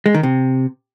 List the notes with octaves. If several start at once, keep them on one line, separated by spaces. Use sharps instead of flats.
G#3
D#3
C3